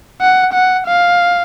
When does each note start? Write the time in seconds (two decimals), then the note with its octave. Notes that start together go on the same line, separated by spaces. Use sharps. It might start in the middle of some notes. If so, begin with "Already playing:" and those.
0.21 F#5
0.53 F#5
0.87 F5